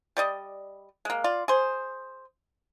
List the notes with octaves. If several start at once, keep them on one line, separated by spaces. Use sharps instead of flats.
G3 D5 D#5
G#3 A#3
F4 D5
G#4 C5